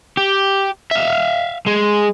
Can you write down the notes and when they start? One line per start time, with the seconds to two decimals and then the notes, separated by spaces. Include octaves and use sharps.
0.17 G4
0.91 E5 F5
1.66 G#3